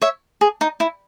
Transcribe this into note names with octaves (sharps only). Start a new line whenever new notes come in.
C#5 E5
G#4
D#4
E4